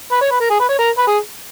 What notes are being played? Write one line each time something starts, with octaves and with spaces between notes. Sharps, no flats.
B4
C#5
B4
A#4
G#4
B4
C#5
A#4
B4
G#4